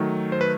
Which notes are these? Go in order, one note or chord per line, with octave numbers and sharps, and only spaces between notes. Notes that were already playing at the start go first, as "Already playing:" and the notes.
Already playing: D#3 F#3 A3
C5
B4